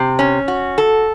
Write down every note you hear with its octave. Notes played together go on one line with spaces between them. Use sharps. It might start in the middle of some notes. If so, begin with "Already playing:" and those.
Already playing: C3
C#4
F#4
A4